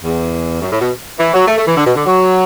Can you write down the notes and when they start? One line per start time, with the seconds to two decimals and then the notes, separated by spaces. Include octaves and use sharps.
0.04 E2
0.62 F#2
0.71 A2
0.81 B2
1.19 E3
1.34 F#3
1.48 A3
1.58 A3
1.67 E3
1.76 D3
1.86 B2
1.95 D3
2.05 F#3